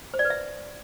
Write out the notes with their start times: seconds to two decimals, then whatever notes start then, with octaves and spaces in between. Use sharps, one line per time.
0.14 C5
0.19 D5
0.25 B4
0.30 E5